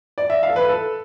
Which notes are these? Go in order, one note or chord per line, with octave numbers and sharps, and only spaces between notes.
D5
E5
F5
A4
B4
A4